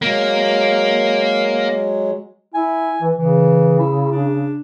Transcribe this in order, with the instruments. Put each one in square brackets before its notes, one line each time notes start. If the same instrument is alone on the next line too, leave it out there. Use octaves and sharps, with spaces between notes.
[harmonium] F#3 G#3 [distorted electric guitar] A#3
[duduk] E4 [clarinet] G#5
[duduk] E3
[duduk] C#3 [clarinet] E3
[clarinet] E4
D4